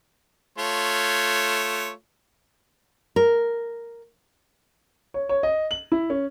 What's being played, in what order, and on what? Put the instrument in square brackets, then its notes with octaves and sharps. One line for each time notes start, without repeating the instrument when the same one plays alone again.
[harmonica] A3 F4 C#5
[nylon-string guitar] A#4
[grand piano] C#5
C#5
D#5
F#7
E4
C#4